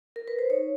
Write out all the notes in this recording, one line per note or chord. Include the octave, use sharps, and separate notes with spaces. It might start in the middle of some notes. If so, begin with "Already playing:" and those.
A#4
B4
C5
D#4 C#5